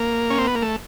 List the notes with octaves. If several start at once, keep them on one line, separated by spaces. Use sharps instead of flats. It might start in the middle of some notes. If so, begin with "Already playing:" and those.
Already playing: A#3
C#4
C4
B3
A#3
A3